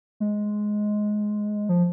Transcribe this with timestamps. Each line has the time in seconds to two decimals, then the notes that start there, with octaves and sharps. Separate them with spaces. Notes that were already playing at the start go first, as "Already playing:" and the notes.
0.20 G#3
1.69 F3